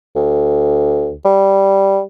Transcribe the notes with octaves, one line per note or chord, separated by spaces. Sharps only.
D2
G3